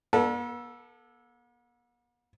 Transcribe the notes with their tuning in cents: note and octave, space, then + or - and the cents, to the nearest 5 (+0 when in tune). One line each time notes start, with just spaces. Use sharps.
B3 -45 A4 +0